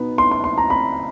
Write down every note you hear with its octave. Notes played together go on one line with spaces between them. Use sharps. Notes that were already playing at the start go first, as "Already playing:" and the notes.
Already playing: B2 B3 D#4
C6
C6
C6
A#5
B5